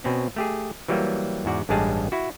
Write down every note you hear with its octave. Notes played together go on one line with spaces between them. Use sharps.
B2 C4 C#4
A3 G4 G#4
E3 F#3 G3 A#3
E2 G#2 F#4 D5
A1 G2 G3 G#3 G#4 A5
E4 F#4